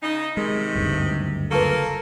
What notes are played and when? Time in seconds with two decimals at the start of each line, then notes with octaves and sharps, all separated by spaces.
0.03 C#3 D#4
0.37 C3 D#3 G#3
0.75 F#1 D2 G2
1.51 A#3 F4 A4 B4 A5 C#6